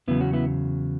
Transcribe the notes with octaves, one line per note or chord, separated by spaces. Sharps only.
E2 C#3 F#3 B3 E4
C#4 F#4
B3 E4